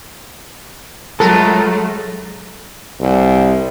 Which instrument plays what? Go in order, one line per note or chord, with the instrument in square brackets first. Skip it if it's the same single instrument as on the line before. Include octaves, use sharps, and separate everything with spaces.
[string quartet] F#3 A3 [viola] G#3 [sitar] B3 F4 A#4 [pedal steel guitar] A4 A#5
[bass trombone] C2